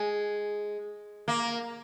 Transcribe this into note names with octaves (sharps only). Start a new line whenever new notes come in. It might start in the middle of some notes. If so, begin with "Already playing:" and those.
Already playing: G#3
A#3